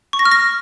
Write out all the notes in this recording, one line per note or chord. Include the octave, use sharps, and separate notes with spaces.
C#6
A#6
F6
A#6